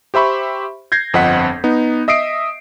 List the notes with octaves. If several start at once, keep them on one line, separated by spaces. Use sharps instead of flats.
G4 C5 E5 B5 C#6
G6 G#6 A#6 C7
G1 F2 C4 D#5 F#5 B6
B3 D#4
D#5 E5 D#6 C7 D7